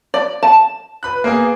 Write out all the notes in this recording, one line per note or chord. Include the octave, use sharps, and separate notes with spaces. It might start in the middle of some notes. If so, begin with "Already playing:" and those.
D5
A5
B4 B5 F#6
A#3 B3 G#4